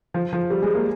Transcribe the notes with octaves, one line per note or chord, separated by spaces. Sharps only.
F3
F3
G3
G#3
A#3